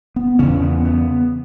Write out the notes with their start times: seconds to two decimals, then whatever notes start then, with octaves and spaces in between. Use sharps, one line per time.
0.16 B3
0.39 E2 C#3 C#4
0.62 B3
0.85 B3